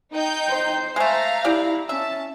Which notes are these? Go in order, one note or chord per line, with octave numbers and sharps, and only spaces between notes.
D#4 G5 G6
C5
G#3 A3 F5 A#5
E4 G4 D5 G5
C#4 E5 A5